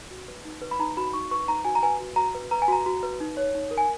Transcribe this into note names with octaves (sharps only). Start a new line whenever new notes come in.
F#4
B4
D#4
B4
B5
D#4 A#5
F#4 B5
D#4 C#6
B4 C#6
D#4 A#5
F#4 G#5
A#5
B4 G#5
F#4
F#4 A#5
B4
B4 A#5
G#5
F#4 A#5
F#4
B4
D#4
C#5
D#4
A#4
G#5